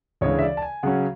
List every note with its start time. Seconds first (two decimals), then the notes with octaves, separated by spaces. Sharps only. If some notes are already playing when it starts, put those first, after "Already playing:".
0.21 D2 C#3 E3 G#3 C#5
0.39 E5
0.42 D5
0.57 A5
0.62 G#5
0.83 C#3 F#3 C#4 F#5